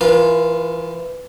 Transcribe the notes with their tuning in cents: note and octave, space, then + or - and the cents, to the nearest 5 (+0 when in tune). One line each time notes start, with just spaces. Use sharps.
E3 +20 F4 +0 A#4 +45